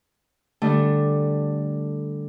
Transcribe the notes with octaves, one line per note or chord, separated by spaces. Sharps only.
D3 G3 A3 D4